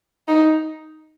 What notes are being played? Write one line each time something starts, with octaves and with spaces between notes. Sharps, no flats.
D#4